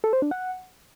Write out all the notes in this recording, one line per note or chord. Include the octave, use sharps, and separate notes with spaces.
A4
C5
D4
F#5